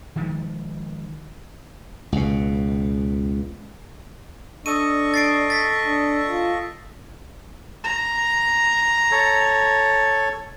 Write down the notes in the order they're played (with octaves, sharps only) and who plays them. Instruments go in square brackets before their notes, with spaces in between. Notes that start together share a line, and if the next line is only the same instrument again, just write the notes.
[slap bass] D#3 F3 G#3
C#2 B2
[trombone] D4 [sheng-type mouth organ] A4 D#5 C#6 [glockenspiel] D#6 D#7
[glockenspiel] A6 C7 D7
A6 B6
[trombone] D4
F4
[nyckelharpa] A#5
[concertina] A4 C#5